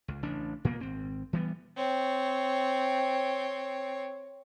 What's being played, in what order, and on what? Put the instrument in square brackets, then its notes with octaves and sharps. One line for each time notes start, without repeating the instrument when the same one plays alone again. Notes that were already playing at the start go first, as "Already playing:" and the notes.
[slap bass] C#2
A1 C#3 D4
A#2 A#3 B3
G#1 C4
E3 G3 B3
[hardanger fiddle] C4 C#5